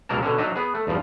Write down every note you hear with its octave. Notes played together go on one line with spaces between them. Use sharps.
C#2 B2 F#3 A#3 A#4 A5
B2 D3 C#4
F#3 D4 D#4 D#5 E5
B3 G#4
A3
E2 G2 F3